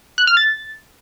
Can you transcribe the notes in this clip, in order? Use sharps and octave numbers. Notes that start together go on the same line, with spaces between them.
F#6
F6
A6